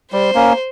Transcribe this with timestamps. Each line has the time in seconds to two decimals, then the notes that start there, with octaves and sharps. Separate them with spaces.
0.12 G3 C5
0.35 A#3 C#4